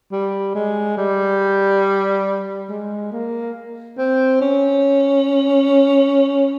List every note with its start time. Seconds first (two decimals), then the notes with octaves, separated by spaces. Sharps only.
0.12 G3
0.55 G#3
0.97 G3
2.69 G#3
3.12 A#3
3.98 C4
4.41 C#4